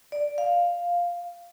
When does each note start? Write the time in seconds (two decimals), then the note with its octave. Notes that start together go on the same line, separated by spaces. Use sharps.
0.12 D5
0.38 F5